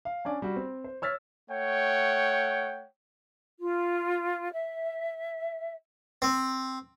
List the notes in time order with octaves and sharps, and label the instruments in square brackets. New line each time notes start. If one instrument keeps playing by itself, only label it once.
[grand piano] F5
C#4 D4 D5 G#5
G3 F#4
C4
C5
C#5 E6 F6 A6 B6
[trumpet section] A3 C#5 F#5 G5
[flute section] F4
E5
[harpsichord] C4